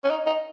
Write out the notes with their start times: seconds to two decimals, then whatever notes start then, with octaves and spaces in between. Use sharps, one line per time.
0.04 C#4
0.10 D#4
0.27 D#4